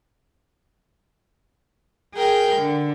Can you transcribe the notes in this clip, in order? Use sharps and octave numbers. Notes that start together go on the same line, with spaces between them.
G#4 A#4 G5 G6
D3